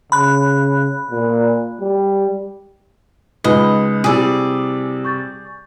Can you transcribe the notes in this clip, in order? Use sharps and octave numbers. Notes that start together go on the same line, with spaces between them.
C#3 B5 F#6
A#2
G3
C#2 D#4 F4 B4 D#5 B5
C3 G3 E4 G#4 D5 D#6 E6
C#6 G6 A6